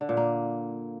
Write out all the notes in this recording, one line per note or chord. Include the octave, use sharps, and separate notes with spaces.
D3
A#2
A#3